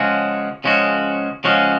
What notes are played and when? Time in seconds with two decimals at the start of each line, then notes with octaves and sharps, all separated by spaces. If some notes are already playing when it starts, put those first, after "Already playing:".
Already playing: C#3 F3 G#3 C#4 F#4
0.64 C#3 F3 G#3 C#4 F#4
1.44 C#3 F3 G#3 C#4 F#4